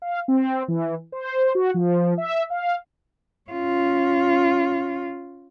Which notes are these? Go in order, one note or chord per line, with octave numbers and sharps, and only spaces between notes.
F5
C4
E3
C5
F#4
F3
E5
F5
C#4 F4